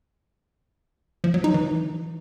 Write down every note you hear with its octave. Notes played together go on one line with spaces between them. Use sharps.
F3
F#3
D#4
E3